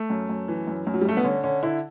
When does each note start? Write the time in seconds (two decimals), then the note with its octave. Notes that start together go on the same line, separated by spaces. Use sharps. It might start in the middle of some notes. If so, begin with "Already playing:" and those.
Already playing: A3
0.10 F#2
0.29 F#2
0.48 E3
0.67 F#2
0.87 F#2
0.94 F#3
1.01 G3
1.05 G2 A3
1.17 B3
1.24 D3 C#4
1.44 D3 C#4
1.63 D3 E4